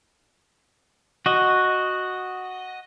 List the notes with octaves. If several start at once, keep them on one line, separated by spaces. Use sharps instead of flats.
F#4 D#5